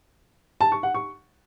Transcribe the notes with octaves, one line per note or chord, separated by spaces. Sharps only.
A5
C#6
F#5
C#6